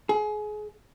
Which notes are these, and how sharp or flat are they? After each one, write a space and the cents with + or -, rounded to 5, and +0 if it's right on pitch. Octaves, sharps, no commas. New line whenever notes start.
G#4 +30